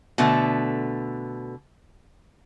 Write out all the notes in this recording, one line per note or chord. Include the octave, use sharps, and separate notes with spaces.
B2 D3 A3 B3